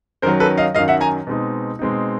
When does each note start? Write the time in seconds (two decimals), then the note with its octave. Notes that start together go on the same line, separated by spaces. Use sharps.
0.22 F#2 D#3 F#3 A#4 C5
0.40 A4 B4
0.57 D#5 F5
0.74 F#2 D#3 F#3 D#5 F5
0.88 E5 F#5
1.01 G#5 A#5
1.27 B2 G#3 C4 D#4
1.79 B2 G#3 C4 D#4